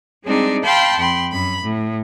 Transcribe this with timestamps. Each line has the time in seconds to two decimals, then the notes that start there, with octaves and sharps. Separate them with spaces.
0.24 G3 G#3 C4 D4 D#4
0.64 F5 G5 A5 B5 C6 G6
0.99 F2 G5 B5 C6
1.31 F#2 B5
1.62 A2